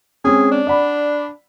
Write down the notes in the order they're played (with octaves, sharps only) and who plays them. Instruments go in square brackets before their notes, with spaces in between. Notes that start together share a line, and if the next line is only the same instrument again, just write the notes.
[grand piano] G#3 C4 C#4 [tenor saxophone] G#4
[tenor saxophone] D4
[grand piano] D5 F#5 B5